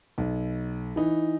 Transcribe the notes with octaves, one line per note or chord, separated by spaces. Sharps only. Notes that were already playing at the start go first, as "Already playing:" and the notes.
B1
E3 D#4